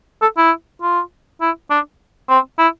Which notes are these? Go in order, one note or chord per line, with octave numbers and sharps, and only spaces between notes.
A4
E4
F4
E4
D4
C4
E4